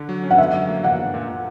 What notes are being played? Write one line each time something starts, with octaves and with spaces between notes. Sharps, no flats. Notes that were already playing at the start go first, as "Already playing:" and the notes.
Already playing: D3
F#3
C#4
F#5
D3 E5
F#3
A#3
A#3 F#5
D4
A#2
A#2